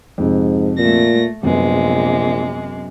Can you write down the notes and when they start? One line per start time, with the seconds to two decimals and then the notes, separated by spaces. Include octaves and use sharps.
0.18 F2 G#2 C3
0.78 A#2 A3 A#6
1.43 A#1 F#2 C3 G#3 B3